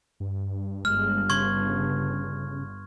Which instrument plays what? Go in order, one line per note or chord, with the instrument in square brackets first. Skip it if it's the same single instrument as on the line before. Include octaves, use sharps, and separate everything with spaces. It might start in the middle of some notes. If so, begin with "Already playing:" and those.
[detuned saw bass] G2
[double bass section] G1 [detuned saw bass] G#3 [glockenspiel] F6
[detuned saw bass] C#3 [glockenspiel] C6 C#6 G#6